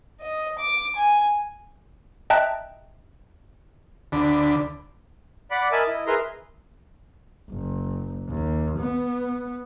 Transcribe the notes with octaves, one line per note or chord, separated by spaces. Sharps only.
D#5
D6
G#5
D#5 E5 G5 A5 A#5 F#6
D2 D3 B5
D5 F#5 B5 D6
A#4 D#5 E5 G#5 A5 B5
E4 D#5
G#4 A#4 B4 E5 A#5 C6
F#1
D#2
B3